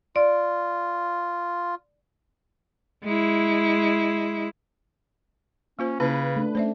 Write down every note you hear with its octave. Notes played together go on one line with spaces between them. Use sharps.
F4 D5
G#3 E4
A#3 C#4 F4 C5
C#3 A#3 C#4 E4 B4
A3 D4
A3 C#4 C5 D5 E5